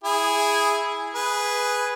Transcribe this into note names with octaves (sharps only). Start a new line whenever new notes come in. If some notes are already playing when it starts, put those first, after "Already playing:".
E4 G#4
G#4 B4